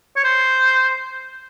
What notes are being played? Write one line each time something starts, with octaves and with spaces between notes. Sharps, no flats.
C#5
C5